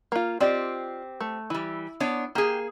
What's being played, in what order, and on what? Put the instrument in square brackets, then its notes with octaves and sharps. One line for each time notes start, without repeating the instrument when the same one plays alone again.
[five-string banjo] A#3 F4
[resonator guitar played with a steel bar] C4 G4 [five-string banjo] F4 D5 D#5
[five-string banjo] A3
[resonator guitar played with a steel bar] E3 G3 [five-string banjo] E4
[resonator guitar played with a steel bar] B3 D4 C#5
[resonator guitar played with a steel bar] A#3 G#4 [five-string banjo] G4